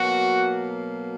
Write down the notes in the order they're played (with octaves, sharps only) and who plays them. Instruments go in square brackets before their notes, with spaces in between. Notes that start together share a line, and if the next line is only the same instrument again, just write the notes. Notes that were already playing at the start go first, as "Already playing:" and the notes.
Already playing: [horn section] B2 F#3 A#3 F#4